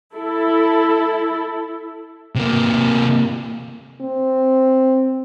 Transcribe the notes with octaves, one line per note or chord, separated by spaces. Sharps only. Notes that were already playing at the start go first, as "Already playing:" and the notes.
E4 A4
C3 A#3
C4